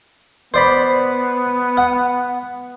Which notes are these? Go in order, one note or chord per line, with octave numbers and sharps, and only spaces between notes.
B3 C5 D5 B5
F#5